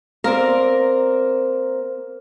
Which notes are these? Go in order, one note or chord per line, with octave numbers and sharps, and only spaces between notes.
A#3 C4 A#4 D5